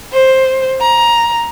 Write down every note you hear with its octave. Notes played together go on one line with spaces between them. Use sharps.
C5
A#5